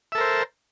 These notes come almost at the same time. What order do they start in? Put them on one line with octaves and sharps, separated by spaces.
E5 A4 A#4 C5